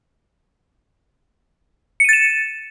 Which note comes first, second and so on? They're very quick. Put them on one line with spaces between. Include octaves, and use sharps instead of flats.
C#7 D#7 A6 E7